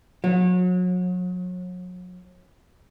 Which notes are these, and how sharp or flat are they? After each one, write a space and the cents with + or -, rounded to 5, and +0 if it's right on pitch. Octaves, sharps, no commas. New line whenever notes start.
F#3 -35